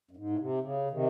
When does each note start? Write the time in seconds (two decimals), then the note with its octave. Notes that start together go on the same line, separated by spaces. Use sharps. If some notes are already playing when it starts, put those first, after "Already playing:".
0.11 F#2
0.17 G#2
0.30 A2
0.39 C3
0.62 C#3
0.91 C3 D#3